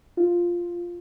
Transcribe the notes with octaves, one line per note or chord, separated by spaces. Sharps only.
F4